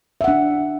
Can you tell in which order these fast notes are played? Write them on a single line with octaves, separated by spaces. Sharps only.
E5 F#5 D4